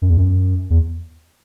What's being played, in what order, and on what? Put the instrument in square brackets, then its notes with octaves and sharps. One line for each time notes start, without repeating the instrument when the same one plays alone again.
[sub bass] F#2
E2
F#2
E2